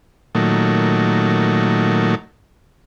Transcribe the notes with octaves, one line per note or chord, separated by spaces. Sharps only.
A#2 D#3 F#3 A3